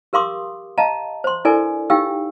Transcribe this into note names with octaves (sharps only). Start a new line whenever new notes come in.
G4 A#4 F5 C6 D6 D#6
D#5 F5 A5 A#5
C5 C6
D4 E4 A4 A#4 D5 G#5
D#4 G4 F5 G5 E6